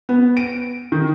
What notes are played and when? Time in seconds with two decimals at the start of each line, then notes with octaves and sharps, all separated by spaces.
0.09 B3
0.37 D7
0.92 D#3